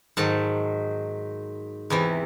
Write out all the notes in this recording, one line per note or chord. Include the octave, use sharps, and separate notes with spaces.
G#2 D#3 F#3 A5
E2 C3 E3